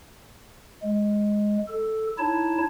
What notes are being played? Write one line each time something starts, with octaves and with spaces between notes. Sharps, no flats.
G#3
A4
D#4 E4 C#5 A5